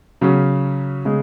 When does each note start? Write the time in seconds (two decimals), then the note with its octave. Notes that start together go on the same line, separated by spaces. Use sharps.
0.21 C#3 F#3 C#4
1.05 C#3 G#3